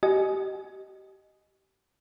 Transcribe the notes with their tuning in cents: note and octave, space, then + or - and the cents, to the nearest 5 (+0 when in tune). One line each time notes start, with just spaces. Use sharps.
G4 -30 D#5 +0 G#5 +20